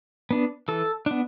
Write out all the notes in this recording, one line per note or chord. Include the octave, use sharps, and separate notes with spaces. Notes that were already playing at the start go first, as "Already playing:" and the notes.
B3 D4
E3 A4
B3 D4